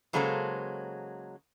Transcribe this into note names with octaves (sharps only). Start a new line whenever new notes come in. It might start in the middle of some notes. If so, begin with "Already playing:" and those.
C#3 F#3 G#3 A#3 A4 C5